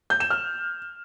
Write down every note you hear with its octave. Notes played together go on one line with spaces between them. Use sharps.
G6
E7
F6